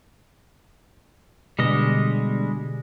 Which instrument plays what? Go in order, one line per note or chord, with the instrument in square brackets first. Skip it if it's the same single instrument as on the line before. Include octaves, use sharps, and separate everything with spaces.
[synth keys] B2 D3 [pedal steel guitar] G3 G#3 D#5